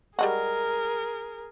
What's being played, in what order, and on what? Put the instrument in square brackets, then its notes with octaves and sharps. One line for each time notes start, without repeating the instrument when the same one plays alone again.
[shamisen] G3 G#3 F#4 [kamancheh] G#4 A#4